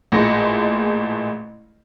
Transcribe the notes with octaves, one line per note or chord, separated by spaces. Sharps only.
A1 A#2 G#3 A3 A#6 C#7